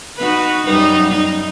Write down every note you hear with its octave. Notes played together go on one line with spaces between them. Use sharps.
D#4 F#4 B4
F#2 G3 D#4
D#4